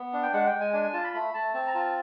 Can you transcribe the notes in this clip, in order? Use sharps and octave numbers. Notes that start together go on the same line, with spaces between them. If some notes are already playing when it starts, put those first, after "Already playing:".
Already playing: B3
D4
G5
G#3 F#5
G5
G#3
G#5
D4 G#5
G#5
F4 A5
B5
A3 B5
A3 A5
C4 A5
A#5
F4 A5